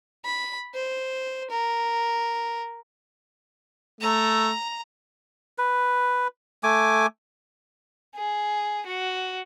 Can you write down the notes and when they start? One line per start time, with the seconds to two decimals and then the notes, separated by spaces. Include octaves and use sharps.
0.25 B5
0.74 C5
1.50 A#4
4.01 A3 A#5
5.58 B4
6.63 A3 G#5 D6
8.15 G#4
8.85 F#4